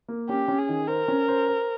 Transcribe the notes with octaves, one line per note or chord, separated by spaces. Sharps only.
A#3
C#4 G4
C#4
G#4
D#3
A#4 C5
C#4
C5
C5